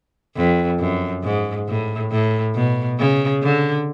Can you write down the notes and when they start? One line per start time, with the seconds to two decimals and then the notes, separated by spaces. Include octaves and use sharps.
0.36 F2
0.80 F#2
1.23 G#2
1.68 A2
2.11 A2
2.55 B2
2.98 C#3
3.42 D3